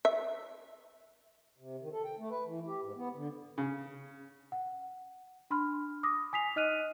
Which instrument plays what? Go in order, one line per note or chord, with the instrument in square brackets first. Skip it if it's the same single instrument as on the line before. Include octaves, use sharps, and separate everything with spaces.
[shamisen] E5
[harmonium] C3
D#3
A4
G5
A3
B4
E3
G4
G#2
B3
D3
[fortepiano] C#3
[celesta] F#5
D4 B5 C6 F6
D6 D#6 A#6
G#5 D#6 B6 C7 F7
D#4 D#5 F6 F#6 D#7 F7